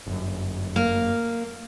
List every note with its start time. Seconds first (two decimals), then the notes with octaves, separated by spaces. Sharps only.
0.06 G1 F#2
0.76 A#3